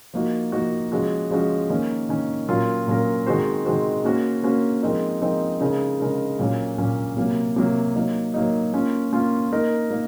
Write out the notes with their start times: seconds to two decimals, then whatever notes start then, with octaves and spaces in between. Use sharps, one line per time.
0.14 F3 A#3 D#4 F#4
0.52 F3 A#3 D#4 F#4
0.92 F3 G#3 C#4 F#4
1.31 F3 G#3 C#4 F#4
1.70 D#3 A#3 C#4
2.09 D#3 A#3 C#4
2.48 A#2 F#3 C#4 F4 A#4
2.87 A#2 F#3 C#4 F4 A#4
3.26 D#3 G#3 C4 F#4 C5
3.65 D#3 G#3 C4 F#4 C5
4.04 A#3 C#4 F#4 C5
4.44 A#3 C#4 F#4 C5
4.82 F3 G#3 C4 D#4 A#4
5.22 F3 G#3 C4 D#4 A#4
5.61 C#3 G#3 D#4 A#4
6.00 C#3 G#3 D#4 A#4
6.39 A#2 F#3 A#3 C#4
6.78 A#2 F#3 A#3 C#4
7.17 C3 F#3 A#3
7.56 C3 F#3 A#3
7.95 F#3 A#3 D#4
8.34 F#3 A#3 D#4
8.73 A#3 C#4 F4
9.13 A#3 C#4 F4
9.52 A#3 D#4 A#4
9.90 A#3 D#4